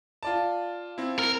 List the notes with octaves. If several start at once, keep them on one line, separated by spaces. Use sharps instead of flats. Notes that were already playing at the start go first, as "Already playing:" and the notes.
F4 D5 A5
C4 E4
A#4